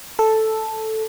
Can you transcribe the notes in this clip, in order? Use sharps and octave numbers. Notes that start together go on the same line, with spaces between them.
A4